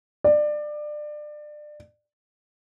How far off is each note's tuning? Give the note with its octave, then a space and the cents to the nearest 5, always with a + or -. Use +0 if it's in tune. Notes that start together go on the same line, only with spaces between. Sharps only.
D5 +25